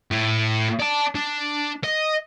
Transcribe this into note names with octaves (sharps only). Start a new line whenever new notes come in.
A2
D5 A5
D4
D#5